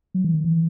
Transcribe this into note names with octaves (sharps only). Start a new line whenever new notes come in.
F#3
E3
D#3
E3